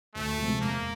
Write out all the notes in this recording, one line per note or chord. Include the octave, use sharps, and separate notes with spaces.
D2 A3
C3 F3 G#3
E1 A#3